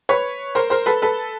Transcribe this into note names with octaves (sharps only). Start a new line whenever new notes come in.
B4 C#5
A#4 C5
A#4 C5
A4 B4
A4 B4